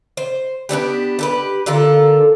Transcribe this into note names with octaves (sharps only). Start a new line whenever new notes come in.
C5
B3 C4 D4 G4
G4 A4 B4
D3 F4 A4 A#4